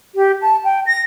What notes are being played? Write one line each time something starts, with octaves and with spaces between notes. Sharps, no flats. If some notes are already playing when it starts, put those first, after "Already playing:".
G4
A5
G5
A#6